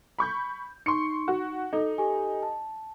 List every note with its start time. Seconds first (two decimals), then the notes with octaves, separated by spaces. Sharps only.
0.19 B5 C#6 G6
0.86 D#4 C6 C#6 C#7
1.28 F#4
1.73 D#4 A4
1.98 G4 A4 G#5
2.43 A5